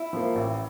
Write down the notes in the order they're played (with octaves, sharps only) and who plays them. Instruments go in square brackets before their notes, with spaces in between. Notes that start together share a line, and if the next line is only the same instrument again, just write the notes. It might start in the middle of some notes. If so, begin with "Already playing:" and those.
Already playing: [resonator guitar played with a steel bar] E4
[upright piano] F3 A#3
A1